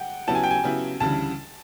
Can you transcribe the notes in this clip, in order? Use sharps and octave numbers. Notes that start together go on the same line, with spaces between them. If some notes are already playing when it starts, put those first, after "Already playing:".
Already playing: F#5 G5
C#3 F#3 B3 E4 G4 A5
G#5
G5
G#5
C#3 F#3 B3 E4 G4
D2 C#3 E3 G3 A5